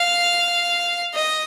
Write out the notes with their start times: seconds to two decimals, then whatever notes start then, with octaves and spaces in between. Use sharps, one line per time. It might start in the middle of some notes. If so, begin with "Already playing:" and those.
Already playing: F5
1.14 D#5